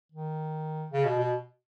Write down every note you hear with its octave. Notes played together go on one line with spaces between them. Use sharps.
D#3
C#3
B2
B2